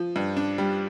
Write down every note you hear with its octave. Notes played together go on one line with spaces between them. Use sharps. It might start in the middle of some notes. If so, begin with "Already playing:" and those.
Already playing: F3
G2
D4
G3